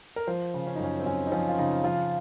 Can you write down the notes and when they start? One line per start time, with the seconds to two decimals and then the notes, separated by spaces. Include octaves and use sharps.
0.16 A#4
0.27 F3 C5
0.54 C#3
0.67 C#4
0.75 D#4
0.79 F#2 C#4
1.00 C4
1.06 F#2 C#4
1.27 D#4
1.32 F3 C#4
1.49 F4
1.58 C#3 D#4
1.84 F3 F4